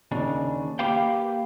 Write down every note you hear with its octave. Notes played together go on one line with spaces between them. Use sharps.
D#2 C#3 D4
A#3 G4 B4 F5 G5